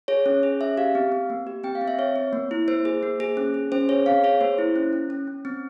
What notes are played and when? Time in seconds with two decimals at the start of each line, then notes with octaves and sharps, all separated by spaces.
0.08 G#4 C#5
0.26 C#4
0.43 G#4
0.61 C#4 E5
0.77 G4 F5
0.95 C4
1.12 C4
1.30 A#3
1.47 G4
1.64 C4 G5
1.75 F5
1.81 C4
1.88 E5
1.99 C4 C#5
2.16 C4
2.33 A#3
2.51 E4
2.68 A#3 C5
2.85 G#4
3.03 A#3
3.20 G#4
3.37 C#4
3.54 G#4
3.72 C#4 C5
3.89 G#4 C#5
4.06 C4 F5
4.24 G#4 C#5
4.40 A#3 C5
4.58 E4
4.76 C#4
4.93 C#4
5.10 C#4
5.27 C#4
5.45 C4